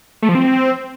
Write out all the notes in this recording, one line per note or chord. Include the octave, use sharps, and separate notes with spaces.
A3
F3
C4